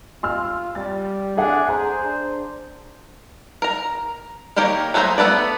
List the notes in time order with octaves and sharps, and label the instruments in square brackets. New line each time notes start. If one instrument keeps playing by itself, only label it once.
[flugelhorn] F4 [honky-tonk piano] C6 E6 F6
[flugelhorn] G3 [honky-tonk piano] A6
[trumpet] D4 [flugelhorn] G#4 [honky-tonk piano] A4 E5 F#5
[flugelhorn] G#4 [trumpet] C5 [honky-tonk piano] A#5
[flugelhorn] D4
[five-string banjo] A#4 A#5
D#3 A#3 G4 A#4 C#5
F#3 A3 G#4 C5 A#5
A3 B3 A4 D5